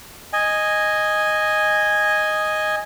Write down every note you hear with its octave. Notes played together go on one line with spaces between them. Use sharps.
D#5 G#5